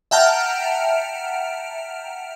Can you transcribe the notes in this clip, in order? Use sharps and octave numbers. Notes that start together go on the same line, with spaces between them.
E5 F#5 G5 A5 A#5 F6